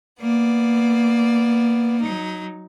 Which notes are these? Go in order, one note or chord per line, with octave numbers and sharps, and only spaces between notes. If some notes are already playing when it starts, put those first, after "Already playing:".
A#3 B3 D5
F#3 D#4